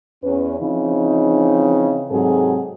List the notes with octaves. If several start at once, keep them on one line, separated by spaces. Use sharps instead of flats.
E2 C#4 B4
C#3 E3 F3 C4 D#4
G#2 C3 F#3 C4 G#4 A4